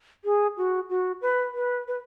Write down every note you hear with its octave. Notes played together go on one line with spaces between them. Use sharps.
G#4
F#4
F#4
B4
B4
B4